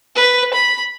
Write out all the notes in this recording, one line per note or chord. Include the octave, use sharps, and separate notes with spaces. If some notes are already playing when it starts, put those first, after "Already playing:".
B4
B5